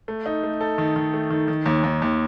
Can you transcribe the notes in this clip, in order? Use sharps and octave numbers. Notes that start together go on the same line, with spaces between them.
A3
D#4
A3
A4
D#3
D#3
A3
D#3
D#3
D#2
D#2
D#2